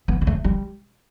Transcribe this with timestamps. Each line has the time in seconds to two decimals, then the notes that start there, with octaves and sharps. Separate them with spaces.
0.08 B3
0.21 B3
0.27 A3
0.44 G3